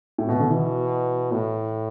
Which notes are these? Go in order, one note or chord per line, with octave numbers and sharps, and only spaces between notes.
A2
B2
D3
B2 E3
A2